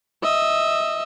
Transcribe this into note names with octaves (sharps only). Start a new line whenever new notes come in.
D#5 E5